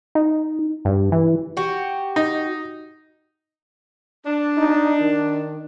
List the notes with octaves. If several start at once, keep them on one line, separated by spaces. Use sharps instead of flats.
D#4
G2
E3
F#4 G4
D#4
D4
D#4
D#3